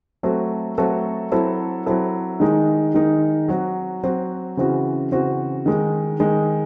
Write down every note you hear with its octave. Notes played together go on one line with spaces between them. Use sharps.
F#3 A3 C4 F#4 A4
F#3 A3 C4 F#4 A4
F#3 C4 E4 A4
F#3 C4 E4 A4
D#3 G#3 D#4
D#3 G#3 D#4
F#3 C4 F#4
F#3 C4 F#4
C#3 E3 C4 F#4
C#3 E3 C4 F#4
D#3 G#3 D#4
D#3 G#3 D#4